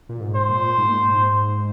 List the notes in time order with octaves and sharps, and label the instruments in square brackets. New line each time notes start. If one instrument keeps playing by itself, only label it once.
[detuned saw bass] A#2
G#2
[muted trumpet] C5
[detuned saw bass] A#2
G#2
A#2
G#2